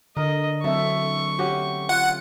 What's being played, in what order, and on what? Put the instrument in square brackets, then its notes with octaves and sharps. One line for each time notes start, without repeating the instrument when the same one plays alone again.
[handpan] D3 [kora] A#4 [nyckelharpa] D#5
[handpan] F#3 C4 E5 [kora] A3 [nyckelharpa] C#6
[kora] C#4 F#4 G4
[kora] F4 [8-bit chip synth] F#5